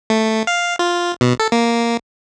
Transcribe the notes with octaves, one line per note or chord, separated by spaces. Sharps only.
A3
F5
F4
B2
A4
A#3